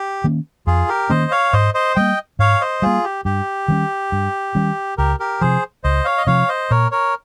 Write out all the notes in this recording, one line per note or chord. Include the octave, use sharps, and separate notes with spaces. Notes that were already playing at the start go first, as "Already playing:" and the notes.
Already playing: G4
D#3 A#3 C#4
F2 F4 G#4
G4 A#4
D#3 A#3 C#4 C5 D#5
C#5 F5
G#2 C5 D#5
C5 D#5
G3 A#3 D#5 G5
G#2 C#5 F5
C5 D#5
G3 A#3 F4 G#4
G4
G2 G4
D#3 G3 C#4
G2
D#3 G3 C#4
C#2 G4 A#4
G4 A#4
C3 F3 G#4 C5
C#2 C5 D#5
C#5 F5
D#5
C3 F3 C#5 F5
C5 D#5
A#2 A#4 C#5
A#4 C#5